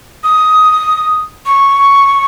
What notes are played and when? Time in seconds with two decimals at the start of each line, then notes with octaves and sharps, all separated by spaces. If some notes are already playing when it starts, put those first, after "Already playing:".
0.24 D#6
1.46 C#6